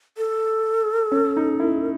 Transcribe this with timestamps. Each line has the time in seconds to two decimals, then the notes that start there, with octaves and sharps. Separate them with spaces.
0.18 A4
1.12 C#4
1.37 D#4
1.60 E4